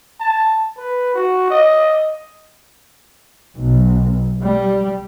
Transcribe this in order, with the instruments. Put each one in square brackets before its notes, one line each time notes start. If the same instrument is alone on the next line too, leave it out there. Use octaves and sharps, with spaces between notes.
[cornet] A5
B4
F#4
D#5
[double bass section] B1
G3